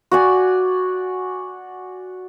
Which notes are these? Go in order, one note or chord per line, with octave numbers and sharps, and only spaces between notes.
F#4 D5 G#5